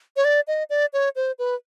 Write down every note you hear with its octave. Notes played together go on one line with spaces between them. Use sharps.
C#5
D5
D#5
D5
C#5
C5
B4